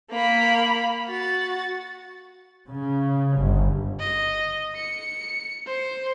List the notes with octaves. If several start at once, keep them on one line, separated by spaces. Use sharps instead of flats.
A#3 B5
F#4 A6
C#3
G1
D#5
C#7
C5